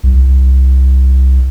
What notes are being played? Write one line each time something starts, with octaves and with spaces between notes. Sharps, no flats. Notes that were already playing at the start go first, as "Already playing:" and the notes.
C2